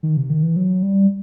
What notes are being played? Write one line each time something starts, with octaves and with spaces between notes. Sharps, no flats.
D#3
C3
D#3
E3
F#3
G3